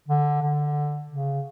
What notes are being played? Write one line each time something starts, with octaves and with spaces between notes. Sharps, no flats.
D3
D3
C#3